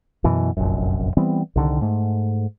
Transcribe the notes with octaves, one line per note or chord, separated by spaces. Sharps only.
F#2 B2 E3
F1 A#1 F#2
E3 G3 B3 C4
C2 D3 D#3
G#2 A3